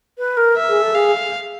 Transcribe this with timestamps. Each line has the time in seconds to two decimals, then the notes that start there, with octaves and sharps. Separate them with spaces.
0.18 B4
0.37 A#4
0.57 E5
0.69 G#4
0.82 A4
0.95 G#4 F5